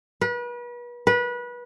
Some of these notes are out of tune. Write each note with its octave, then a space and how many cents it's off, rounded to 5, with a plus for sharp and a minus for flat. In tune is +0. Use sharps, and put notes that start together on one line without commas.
B4 -35
B4 -25